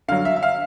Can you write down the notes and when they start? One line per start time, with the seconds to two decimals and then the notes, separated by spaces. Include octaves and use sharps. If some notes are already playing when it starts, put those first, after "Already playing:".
0.08 D3 F#3 F5
0.25 E5
0.36 E5
0.43 F5